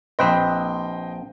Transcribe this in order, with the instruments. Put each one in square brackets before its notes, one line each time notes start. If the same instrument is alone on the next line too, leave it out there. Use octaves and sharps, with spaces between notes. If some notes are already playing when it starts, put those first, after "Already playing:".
[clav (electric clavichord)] A#1 C4 B4 [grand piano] D#5 G5 C6